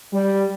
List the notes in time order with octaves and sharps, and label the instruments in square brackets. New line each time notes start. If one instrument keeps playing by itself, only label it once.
[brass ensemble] G3